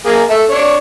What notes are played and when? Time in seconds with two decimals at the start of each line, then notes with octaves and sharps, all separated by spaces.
0.06 A#3 G#4
0.30 A4 E5
0.50 D4 C#5